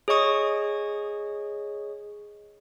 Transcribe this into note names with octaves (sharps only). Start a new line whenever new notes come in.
G#4 C#5 D#5 C#6 D#6